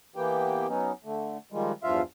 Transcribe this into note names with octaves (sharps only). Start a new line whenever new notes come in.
E3 A#3 B3 G4 G5
F#3 B3 C#4 D#4
D3 A3
D#3 F3 G3 G#3
E2 G2 F3 F4 E5 F5